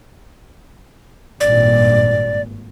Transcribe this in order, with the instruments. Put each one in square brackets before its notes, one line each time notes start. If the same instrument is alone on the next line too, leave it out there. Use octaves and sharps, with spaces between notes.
[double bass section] G#1 G2 A#2 [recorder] D5